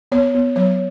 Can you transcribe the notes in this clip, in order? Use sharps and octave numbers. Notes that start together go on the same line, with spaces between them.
B3 C#5
B3
F#3 C#5